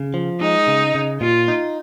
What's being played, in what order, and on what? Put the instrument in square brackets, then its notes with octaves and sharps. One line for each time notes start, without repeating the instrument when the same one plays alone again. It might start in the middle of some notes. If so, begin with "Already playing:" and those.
Already playing: [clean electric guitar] C#3
F3
[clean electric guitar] G#3 [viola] D#4
[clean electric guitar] C#3
C#3
[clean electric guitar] A#2 [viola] F4
[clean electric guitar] D#4